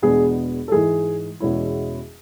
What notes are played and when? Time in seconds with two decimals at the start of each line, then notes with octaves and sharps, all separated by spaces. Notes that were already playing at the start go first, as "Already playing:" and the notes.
0.02 E2 B2 G#3 B3 D4 G#4
0.68 A4
0.72 G#2 E3 G#3 G#4
1.40 E2 B2 G#3 C#4 E4